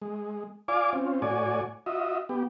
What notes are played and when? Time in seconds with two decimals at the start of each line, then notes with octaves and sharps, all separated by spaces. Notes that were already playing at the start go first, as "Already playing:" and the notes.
0.02 G#3
0.68 F4 D5 F5 G#5 D6
0.93 C4 C#4 F4
1.22 A2 F#4 C#5 D5 G#5
1.86 F4 F#4 D#5 E5
2.29 B3 G4